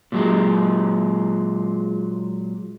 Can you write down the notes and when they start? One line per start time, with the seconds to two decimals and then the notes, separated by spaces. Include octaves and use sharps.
0.12 A#2 F#3 G#3